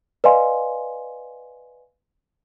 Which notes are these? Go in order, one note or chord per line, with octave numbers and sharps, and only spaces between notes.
B4 D5 D#5 F5 G#5 C6